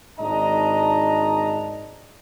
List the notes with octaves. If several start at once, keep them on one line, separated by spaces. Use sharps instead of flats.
G#1 G#2 D4 D#5 A5 A#5